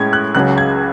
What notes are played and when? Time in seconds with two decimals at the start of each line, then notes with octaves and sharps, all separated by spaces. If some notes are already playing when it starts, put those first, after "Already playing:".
Already playing: A2 G#3 C#4 G#6
0.13 F#6
0.35 C#2 C#3 F#3 C#4 F#6
0.58 G#6